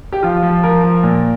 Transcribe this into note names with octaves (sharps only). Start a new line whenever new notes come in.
G4
F3 F4
F3
F3 A#4
F3
A#2